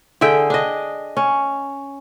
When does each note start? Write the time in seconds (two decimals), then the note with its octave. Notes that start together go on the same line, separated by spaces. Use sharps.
0.21 D3 G#4 E5 G5
0.50 D4 D#5
1.17 C#4